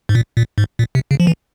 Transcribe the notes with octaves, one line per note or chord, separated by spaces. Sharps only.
G#2
A#2
A#2
G#2
A#2
C3
C#3
F3
E3